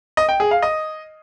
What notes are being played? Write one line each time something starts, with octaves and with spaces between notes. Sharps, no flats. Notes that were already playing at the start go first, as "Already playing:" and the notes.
D#5
G5
G#4
F5
D#5